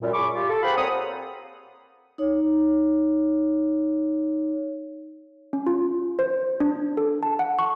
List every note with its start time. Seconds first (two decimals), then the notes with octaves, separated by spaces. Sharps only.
0.01 F#2 A#2 G3
0.13 G#4 B5 C#6 D6
0.34 F4 G4
0.50 A4
0.63 G4 G#4 C5 F5 F#5 B5
0.76 A#2 C4 C#5 F#5 A#5 D#6
2.18 D#4 C#5
5.53 C#4
5.67 F4
6.19 C5
6.60 D4
6.97 A4
7.23 A5
7.39 F#5
7.59 C#6